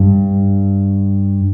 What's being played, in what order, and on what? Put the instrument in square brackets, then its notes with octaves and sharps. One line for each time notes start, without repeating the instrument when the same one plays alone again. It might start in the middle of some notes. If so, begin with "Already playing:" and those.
Already playing: [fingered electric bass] G2